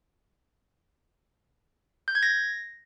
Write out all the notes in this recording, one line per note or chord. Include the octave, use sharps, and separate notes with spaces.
G6
G#6
A#6